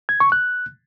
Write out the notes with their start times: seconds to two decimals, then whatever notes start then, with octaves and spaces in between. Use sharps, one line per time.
0.09 G#6
0.20 C#6
0.32 F#6